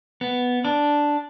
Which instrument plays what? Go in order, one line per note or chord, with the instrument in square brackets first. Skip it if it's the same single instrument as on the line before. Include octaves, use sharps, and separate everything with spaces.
[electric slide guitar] B3
D4